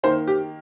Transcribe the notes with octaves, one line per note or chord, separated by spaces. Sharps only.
D#3 A#3 C5
G4